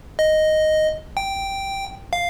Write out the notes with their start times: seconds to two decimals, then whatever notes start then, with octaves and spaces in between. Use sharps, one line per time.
0.19 D#5
1.17 G5
2.13 F5